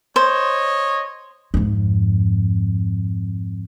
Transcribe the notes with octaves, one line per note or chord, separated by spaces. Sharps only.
C5 C#5 D#5
F2 G#2